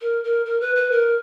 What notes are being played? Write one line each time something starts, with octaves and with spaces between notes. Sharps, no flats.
A#4
A#4
A#4
B4
B4
A#4